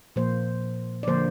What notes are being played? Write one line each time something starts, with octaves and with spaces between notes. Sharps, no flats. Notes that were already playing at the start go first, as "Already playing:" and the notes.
A#2 F3 A#3 C5
D5
D3 F3 A#3 C5